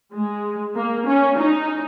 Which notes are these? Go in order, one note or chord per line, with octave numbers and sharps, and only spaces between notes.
G#3
A#3
C#4
D#4